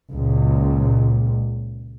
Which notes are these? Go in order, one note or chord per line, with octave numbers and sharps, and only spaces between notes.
C#2 A#2